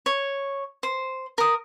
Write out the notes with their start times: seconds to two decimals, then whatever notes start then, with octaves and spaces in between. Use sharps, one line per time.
0.06 C#5
0.83 C5
1.38 A#4 D#6